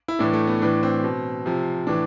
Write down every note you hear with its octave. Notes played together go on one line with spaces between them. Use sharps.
E4
A2 E3 D4
A3
B3
A2 E3 D4
C4
B2
C3 F3
A2 E3 D4